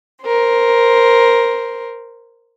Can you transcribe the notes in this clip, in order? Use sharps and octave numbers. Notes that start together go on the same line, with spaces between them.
A#4 C5